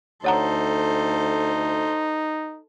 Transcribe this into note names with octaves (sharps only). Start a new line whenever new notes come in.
D2 D#4 A4 C5 C#5 F#5 A#5